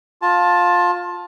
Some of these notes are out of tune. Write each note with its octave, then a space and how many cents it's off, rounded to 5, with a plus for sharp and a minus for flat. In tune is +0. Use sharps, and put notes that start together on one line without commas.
F4 +20 A5 +0